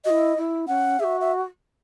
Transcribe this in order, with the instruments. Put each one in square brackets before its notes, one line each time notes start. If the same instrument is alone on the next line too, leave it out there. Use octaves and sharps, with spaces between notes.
[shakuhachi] F#4 [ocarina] D#5
[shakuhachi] E4
E4
[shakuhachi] C#4 [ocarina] F#5
[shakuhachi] F#4 G#4 [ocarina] E5
[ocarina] E5